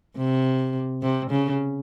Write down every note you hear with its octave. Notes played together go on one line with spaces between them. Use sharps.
C3
C3
C#3